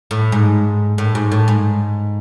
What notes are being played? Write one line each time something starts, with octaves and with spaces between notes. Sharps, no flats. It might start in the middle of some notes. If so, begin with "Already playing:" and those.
A2
G#2
A2
G#2
A2
G#2